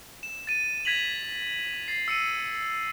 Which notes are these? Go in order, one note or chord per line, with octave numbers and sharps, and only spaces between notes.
E7
A6 D#7
G#6 A#6 B6 D#7 F7 F#7
A6 C7
E6 C#7 D#7